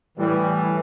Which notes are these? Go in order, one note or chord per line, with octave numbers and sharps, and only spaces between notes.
A2 E3 G3